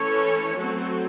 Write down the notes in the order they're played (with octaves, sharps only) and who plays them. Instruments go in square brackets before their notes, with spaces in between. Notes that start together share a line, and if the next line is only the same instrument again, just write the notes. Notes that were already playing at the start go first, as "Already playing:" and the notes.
Already playing: [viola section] E3 A3 C#4 A4 C#5
F#3 A3 C4 F#4 A4